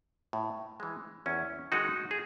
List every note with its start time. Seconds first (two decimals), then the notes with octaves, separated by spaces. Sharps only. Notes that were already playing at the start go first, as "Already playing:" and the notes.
0.33 A2
0.80 E3 G#3
1.26 E2 C#4 E4
1.72 D#3 G#3 D#4 F#4
2.11 G#4